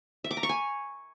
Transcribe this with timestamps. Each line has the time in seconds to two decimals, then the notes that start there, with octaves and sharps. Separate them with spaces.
0.24 E5
0.31 D6
0.37 A#5
0.43 C#6
0.49 G#5